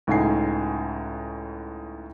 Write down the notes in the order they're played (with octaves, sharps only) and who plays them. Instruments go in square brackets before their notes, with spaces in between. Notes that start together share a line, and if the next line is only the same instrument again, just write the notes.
[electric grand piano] C#2 A2 D#4 F#5 G#5 C7